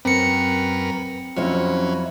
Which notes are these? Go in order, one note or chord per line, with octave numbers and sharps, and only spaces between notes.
F#2 C4 A#4 B4 C#7
F2 F#3 C#4 E4